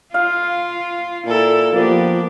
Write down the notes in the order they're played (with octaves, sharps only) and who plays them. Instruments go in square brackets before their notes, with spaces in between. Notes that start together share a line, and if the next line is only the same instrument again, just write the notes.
[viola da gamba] F4 [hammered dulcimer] F5
[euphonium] A#2 [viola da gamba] E4 A4 A#4
[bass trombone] F3 [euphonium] A#3 [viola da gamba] B3 D4 G4